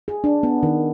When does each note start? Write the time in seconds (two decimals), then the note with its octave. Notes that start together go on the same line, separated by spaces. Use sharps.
0.08 G#4
0.24 D4
0.43 B3
0.63 D#3